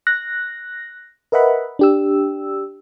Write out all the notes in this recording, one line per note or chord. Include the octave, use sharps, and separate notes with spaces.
F#6 A#6
A#4 B4 D#5 E5 F#5 B5
D4 G4 E6